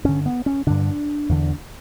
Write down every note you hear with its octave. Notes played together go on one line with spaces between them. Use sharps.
G2 D3 C#4
B3
C#4
G2 D3 D4
E2 D3